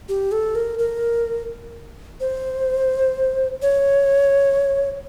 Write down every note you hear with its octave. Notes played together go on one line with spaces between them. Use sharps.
G4
A4
A#4
A#4
C5
C#5